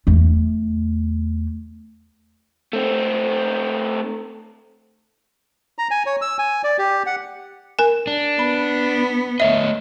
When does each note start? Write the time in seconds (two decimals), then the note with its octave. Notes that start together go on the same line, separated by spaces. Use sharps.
0.07 E2 A3
2.73 A3 C4
5.78 A#5
5.91 G#5
6.06 C#5
6.22 E6
6.39 G#5
6.64 D5
6.79 G4
7.06 F#5
7.79 A#4 G#5
8.07 D4
8.39 B3 B5
9.40 A3 C#5 D#5 E5